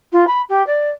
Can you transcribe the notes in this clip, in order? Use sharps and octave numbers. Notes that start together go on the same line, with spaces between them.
F4
B5
G4
D5